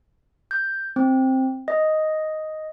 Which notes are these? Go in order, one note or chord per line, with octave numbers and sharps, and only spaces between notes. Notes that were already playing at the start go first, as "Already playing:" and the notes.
G6
C4
D#5